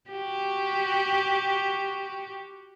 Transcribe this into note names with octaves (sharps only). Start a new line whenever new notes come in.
F#4 G4